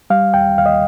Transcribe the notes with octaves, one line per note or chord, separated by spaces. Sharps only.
G3 F5
D#2 G5
D#2 F5
D#5